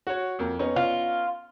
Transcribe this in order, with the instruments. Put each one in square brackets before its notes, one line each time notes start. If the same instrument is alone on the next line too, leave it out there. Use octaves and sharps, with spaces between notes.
[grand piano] F#4 C#5
F2 A#3
B3 C#4 D#4
[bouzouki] F4